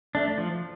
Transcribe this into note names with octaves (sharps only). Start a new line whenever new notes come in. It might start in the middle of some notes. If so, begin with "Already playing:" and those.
A3 D4
F3